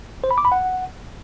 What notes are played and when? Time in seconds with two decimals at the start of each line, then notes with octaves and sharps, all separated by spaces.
0.24 C5
0.31 B5
0.38 D6
0.45 B5
0.52 F#5